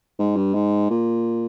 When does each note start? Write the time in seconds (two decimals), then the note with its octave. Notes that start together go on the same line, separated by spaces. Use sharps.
0.19 G#2
0.36 G2
0.54 G#2
0.90 A#2